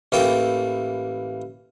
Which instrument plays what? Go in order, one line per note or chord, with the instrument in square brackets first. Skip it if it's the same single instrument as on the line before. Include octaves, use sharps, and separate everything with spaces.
[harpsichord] A1 E3 A#3 A4 G5